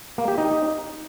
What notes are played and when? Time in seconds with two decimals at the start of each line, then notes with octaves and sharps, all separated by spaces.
0.18 A#3
0.28 G4
0.38 D#4